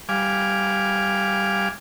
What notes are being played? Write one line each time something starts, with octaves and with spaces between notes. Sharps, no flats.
G3 F5 G#5 D6